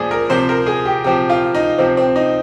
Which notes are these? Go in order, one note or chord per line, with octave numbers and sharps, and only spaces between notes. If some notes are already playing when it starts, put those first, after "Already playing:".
Already playing: A#2 F3 G#4 D5
A#4
C3 F3 C5
A#4
G#4
G4
C3 F3 G4
F4
D#4
C3 F3 C4
C4
D#4